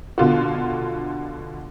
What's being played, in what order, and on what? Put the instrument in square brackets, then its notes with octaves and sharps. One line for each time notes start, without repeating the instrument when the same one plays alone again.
[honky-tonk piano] B2 D3 F4 F#4